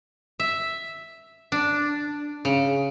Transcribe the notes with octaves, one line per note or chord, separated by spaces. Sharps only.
E5
D4
C#3